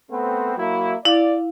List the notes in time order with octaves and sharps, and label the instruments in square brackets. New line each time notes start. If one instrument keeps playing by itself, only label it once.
[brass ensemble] A3 B3 C4
F#3 A#3 E4
[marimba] E4 F5 [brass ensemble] D5